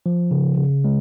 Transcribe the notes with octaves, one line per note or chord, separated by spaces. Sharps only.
F3
C#3
C#3
G#3